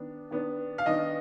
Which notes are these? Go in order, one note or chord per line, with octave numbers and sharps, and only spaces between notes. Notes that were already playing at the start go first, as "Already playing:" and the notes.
Already playing: D#3 B3 D4
D#3 B3 D4
F5
D#3 B3 D4 D#5